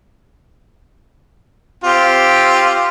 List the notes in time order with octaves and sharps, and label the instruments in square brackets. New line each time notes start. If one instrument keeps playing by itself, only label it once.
[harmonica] C4 F4 G4